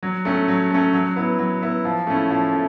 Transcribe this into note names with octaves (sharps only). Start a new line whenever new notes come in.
F#3
A3 C#4
F#3
A3 C#4
F#3
B3 E4
F#3
B3 E4
F3
A3 C#4 E4
F3
A3